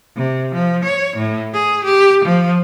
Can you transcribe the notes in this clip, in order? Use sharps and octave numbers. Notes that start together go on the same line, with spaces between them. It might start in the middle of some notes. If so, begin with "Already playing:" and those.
C3
F3
C#5
A2
G#4
G4
F3